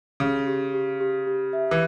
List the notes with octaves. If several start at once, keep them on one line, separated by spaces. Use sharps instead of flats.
C#3 G4
G4
G4
G4
G4
E5
E3